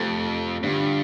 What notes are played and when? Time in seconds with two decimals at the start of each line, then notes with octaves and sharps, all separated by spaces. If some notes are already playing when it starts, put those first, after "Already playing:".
Already playing: F2 C3 A3 F4 A4
0.63 G2 D3 G3 F4